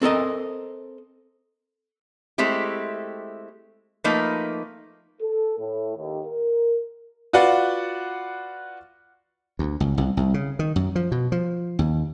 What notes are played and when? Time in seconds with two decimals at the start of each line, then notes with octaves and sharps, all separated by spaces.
0.02 C4 A4 A#4 D#5
2.38 G#3 A3 C4 E4 G4
4.04 F3 A3 A#3 D#4 B4
5.22 A4
5.59 A2
5.97 D#2
6.27 A#4
7.33 F4 F#4 B4 D5 F#5
9.59 D2
9.80 C#2
9.98 C2
10.17 C2
10.34 C#3
10.59 D#3
10.76 F#2
10.95 F3
11.12 B2
11.32 F3
11.79 D#2